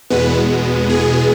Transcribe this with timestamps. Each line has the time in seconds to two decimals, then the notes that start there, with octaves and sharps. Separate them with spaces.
0.10 E2 B2 G#3 B3 B4
0.89 G#4